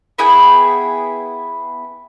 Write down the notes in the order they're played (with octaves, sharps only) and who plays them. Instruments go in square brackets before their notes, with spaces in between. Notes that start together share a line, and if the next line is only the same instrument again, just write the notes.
[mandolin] B3 E4 G#4 G5